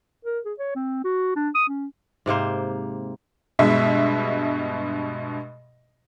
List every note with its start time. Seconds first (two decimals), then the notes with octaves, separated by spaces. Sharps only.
0.25 A#4
0.45 G#4
0.59 C#5
0.75 C4
1.04 F#4
1.36 D4
1.55 D#6
1.68 C#4
2.26 G#2 C3 A#3 C5
3.59 G2 B2 G#3 E5